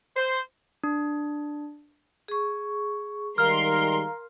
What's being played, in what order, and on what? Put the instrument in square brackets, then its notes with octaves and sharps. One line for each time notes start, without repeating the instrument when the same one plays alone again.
[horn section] C5
[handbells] D4
[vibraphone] G#4 C#6
[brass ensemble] D#3 G3 G#3 [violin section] A#4 C6 [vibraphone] F5 A#5 [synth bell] F6